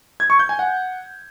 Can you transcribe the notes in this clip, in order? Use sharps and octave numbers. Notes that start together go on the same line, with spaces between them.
G#6
C#6
G6
G#5
F#5